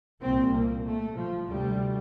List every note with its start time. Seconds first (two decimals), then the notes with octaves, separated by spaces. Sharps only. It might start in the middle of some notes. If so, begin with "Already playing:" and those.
0.21 C2 A#2 C4
0.53 A#3
0.85 A3
1.16 F3
1.49 D2 C3 G3